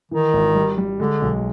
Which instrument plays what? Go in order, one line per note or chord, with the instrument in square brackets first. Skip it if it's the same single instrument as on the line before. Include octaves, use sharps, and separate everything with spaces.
[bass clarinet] D#3 [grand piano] E3
[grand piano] G#1
G3
G3
[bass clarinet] D3 [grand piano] G#3
[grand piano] B1